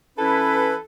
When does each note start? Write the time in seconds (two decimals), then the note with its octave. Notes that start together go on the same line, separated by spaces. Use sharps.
0.18 E3 C#4 E4 A4 B4